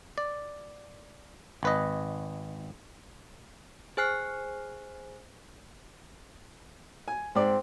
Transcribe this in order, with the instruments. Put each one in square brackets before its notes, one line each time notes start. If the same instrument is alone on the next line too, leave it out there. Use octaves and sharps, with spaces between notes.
[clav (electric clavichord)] D5
G#1 B4 D#5
[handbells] G#4 C5 G#5 F6 F#6 C7
[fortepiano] G#5
[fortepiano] G#2 D5 [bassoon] C4